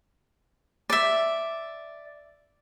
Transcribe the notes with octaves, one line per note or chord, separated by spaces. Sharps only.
D5 E5